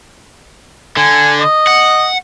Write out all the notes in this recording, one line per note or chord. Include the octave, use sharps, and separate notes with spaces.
D3 G#5
D#5
F#5